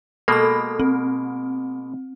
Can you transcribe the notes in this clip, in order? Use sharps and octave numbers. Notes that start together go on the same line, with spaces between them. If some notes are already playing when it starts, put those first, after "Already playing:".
B2 G#3 A#3 A4 B5
C4